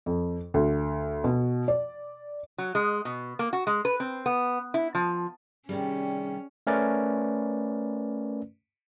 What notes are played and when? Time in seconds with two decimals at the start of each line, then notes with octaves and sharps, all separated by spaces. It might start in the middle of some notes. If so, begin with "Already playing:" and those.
0.06 F2
0.54 D2
1.24 B2
1.68 D5
2.58 F#3
2.75 G#3
3.05 B2
3.39 A#3
3.53 F#4
3.67 G#3
3.85 B4
4.00 C4
4.26 B3
4.74 E4
4.95 F3
5.69 C3 D#3 G3 C#4 G#4 D5 G5
6.67 A3 C#4 A#4 B4 D5